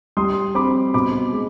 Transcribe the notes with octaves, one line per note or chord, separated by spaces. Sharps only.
G3 C6 D#6
C4 B5 D6
B2 B5 D6
G#3